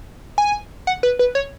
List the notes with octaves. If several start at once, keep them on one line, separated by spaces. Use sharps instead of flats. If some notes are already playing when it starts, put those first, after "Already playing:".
G#5
F#5
B4
B4
C#5